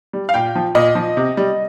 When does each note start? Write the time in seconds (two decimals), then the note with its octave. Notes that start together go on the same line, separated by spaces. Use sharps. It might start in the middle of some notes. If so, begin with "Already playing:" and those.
0.13 G3
0.29 F5
0.34 A#2 G5
0.56 F3
0.75 A#2 D#5
0.95 F3
1.17 C3
1.37 G3